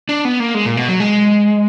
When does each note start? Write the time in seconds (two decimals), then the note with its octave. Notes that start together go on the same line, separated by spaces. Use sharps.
0.09 D4
0.25 B3
0.40 A#3
0.55 G#3
0.66 A#2
0.77 B2
0.89 F#3
1.00 G#3